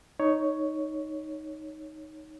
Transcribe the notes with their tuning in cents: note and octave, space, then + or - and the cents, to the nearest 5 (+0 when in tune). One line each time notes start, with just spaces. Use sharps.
D#4 +0 C#5 +10